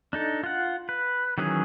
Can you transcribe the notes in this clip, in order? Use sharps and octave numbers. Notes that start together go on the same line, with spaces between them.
D4 D#4 A4
F4 F#5
B4
D#3 E3 F#3 C#4 G#4